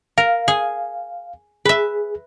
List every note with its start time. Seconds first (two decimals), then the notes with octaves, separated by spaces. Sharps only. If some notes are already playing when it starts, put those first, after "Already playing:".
0.18 A#4 F5
0.48 G#4
1.65 G#4 B4 E5